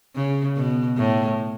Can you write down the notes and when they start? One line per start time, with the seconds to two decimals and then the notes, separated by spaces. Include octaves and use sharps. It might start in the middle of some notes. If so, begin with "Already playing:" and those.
0.15 C#3
0.56 B2
0.97 A2